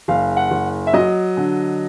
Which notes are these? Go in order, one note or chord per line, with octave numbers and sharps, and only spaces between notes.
F#1 F5
F#5
F#1
E5
F#3 D#5
D3